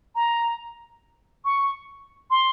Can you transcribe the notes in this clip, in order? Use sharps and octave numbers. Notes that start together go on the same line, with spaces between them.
A#5
C#6
C6